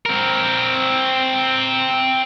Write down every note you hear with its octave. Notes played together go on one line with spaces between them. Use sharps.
C4 A#4